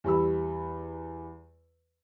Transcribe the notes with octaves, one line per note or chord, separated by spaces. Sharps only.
E2 G3 B5 E6